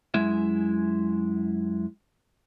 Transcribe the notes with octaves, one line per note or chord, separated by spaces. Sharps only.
F#2 G#3 E4 E5